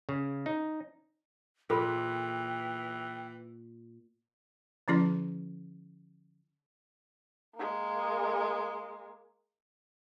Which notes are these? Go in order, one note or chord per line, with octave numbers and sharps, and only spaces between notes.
C#3
D#4
A#2 E3 G#4 A4 B4 G5 B5
D3 F3 C#4 E4 G#4 D5
G#3 A#3